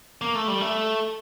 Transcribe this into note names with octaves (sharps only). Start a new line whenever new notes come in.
A#3
A3
G3
A3